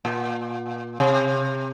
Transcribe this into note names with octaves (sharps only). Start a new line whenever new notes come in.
A#2
C3